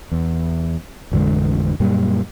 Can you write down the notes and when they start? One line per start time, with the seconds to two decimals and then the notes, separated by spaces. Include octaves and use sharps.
0.12 E2
1.12 A1 F2 D3 G#3
1.80 F#2 A#2 G3